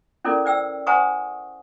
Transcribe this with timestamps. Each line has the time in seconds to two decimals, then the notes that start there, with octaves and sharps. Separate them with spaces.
0.25 C#4 E4 A4 A#4 D5
0.45 C5 D5 G5 E6
0.87 C5 F#5 G#5 A#5 C#6 D#6